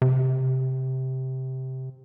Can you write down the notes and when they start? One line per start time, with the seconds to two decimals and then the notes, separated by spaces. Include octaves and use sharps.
0.02 C3